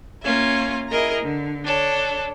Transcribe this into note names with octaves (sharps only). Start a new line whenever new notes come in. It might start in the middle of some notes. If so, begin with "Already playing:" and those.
A#3 C#4 F4 E5
E4 G#4 A#4 D#5 A#5
D3
D4 A4 C#5